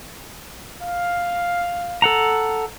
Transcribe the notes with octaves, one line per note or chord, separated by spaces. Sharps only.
F5
A4 F#5 A#5